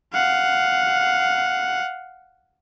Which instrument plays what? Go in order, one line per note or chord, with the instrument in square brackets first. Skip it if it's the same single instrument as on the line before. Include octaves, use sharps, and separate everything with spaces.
[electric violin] F5 F#5